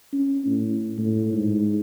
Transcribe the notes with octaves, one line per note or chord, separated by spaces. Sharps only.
C#4
A2
A2
G#2